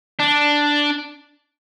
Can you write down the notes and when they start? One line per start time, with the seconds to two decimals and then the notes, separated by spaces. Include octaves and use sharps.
0.20 D4